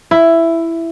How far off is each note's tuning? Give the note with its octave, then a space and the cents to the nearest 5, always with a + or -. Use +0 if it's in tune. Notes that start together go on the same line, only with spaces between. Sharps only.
E4 +10